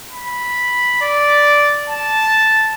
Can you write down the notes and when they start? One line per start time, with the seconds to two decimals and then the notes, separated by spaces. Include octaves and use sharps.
0.11 B5
1.01 D5
1.90 A5